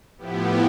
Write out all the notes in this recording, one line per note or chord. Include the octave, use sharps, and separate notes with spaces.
A2 F3 B3 E4 G4